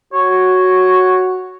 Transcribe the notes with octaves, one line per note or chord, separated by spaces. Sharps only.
F#4 C#5